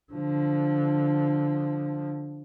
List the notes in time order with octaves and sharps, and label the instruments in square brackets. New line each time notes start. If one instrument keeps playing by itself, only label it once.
[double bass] D3 F3